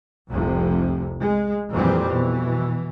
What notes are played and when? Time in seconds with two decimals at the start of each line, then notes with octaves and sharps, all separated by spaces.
0.29 F1 C2 F2 C3
1.21 G#3
1.71 F2 A#2 E3 G3 C4
2.07 B2 E3